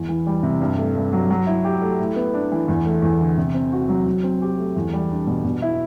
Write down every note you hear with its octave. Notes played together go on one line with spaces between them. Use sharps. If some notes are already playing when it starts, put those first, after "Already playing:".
Already playing: E2
E3
G3
C3
G2
A3
G2
F#3
F#3
E4
G4
A3
A2
B3
D4
E3
E2
A3
E2
D3
C3
C4
F#4
F#3
F#3
C4
G4
A3
E2
G3
D4
B2
B2
E4